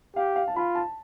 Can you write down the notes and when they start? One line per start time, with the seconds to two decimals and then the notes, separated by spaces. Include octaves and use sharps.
0.16 G4 F5
0.36 F5
0.48 A5
0.56 F4 B5
0.75 A5